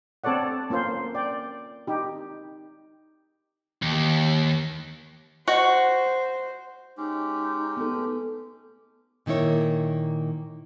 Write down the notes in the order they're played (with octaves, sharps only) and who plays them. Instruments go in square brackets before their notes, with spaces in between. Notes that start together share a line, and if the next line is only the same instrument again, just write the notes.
[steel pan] C4 A4 C#5 D5 F#5
A#3 C#4 F4 C5
D5 G5
D#4 G4
[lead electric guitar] D#2
[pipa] F#4 [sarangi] C5 [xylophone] D#5 F#5 C#6
[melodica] G#3 C#4 G4 [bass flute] D#4
[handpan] B3 A4
[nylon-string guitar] A#2 D#3 A#3 E4 C#5